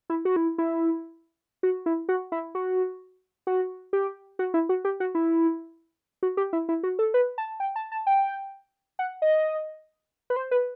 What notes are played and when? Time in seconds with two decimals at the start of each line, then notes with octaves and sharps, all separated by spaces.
0.10 E4
0.25 F#4
0.36 E4
0.58 E4
1.63 F#4
1.86 E4
2.09 F#4
2.32 E4
2.55 F#4
3.47 F#4
3.93 G4
4.39 F#4
4.54 E4
4.69 F#4
4.85 G4
5.00 F#4
5.15 E4
6.23 F#4
6.37 G4
6.53 E4
6.69 E4
6.83 F#4
6.99 A4
7.14 B4
7.38 A5
7.60 G5
7.76 A5
7.92 A5
8.07 G5
8.99 F#5
9.22 D#5
10.30 B4
10.36 C5
10.51 B4